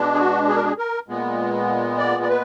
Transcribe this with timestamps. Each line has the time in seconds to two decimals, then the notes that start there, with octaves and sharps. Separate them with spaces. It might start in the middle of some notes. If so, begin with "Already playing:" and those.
Already playing: B2 G#3 D4
0.14 G#4
0.18 F#4
0.49 G#4
0.56 A#4
0.64 G#4
0.78 A#4
1.08 A#2 G#3 B3
1.98 D5
2.23 D5
2.29 B4